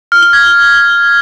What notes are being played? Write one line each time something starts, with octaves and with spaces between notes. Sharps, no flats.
F6
G7
G#6